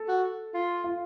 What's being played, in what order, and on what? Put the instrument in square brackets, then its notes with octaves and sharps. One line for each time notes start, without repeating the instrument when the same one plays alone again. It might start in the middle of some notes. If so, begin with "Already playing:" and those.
Already playing: [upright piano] A4
[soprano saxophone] F#4
F4
[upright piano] F4